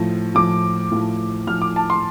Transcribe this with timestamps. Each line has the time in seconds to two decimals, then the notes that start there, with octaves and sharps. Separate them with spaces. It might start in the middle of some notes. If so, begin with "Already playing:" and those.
Already playing: A2 F3
0.35 A2 F3 D6
0.92 A2 F3
1.47 A2 F3 F6
1.62 D6
1.76 A5
1.90 C6